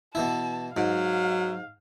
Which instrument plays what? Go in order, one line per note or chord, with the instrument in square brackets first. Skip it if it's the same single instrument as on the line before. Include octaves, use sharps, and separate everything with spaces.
[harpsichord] B2 E3 E4 [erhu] A5
[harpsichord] G#2 [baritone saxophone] F#3 [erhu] F5